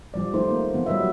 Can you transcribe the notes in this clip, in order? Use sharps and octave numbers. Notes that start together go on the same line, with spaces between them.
F3 G3 D5
F3 A3 D#4 C5
A#3
F3 B3
F#3 G3 B4 D#5 E5